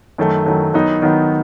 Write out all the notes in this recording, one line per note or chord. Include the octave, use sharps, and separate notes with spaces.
F#2 D#3 F#3 A3
F#2 D#3 F#3 A3
D#3 F#3 B3 D#4
D#3 F#3 B3 D#4